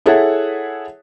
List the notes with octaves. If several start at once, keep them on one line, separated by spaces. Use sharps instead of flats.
E4 G#4 A4 C#5 E5 F#5